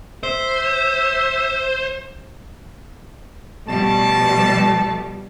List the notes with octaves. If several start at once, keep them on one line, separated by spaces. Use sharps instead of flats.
C5 E5
B2 F3 G3 A3 A5